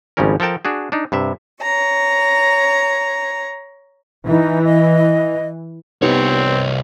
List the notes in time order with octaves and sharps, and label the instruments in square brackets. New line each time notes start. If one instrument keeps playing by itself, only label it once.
[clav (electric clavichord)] G#1 C#3 F3 G3 C#4 A#4
F3 A4 A#4 G5 A5
D4 F#4 G#4
D4 D#4
G2 C3 E5
[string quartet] C#5 A#5
[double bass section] E3 [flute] D#4
[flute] D#5
[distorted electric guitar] C2 C#5 [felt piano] B3 D#4 G4 [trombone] C4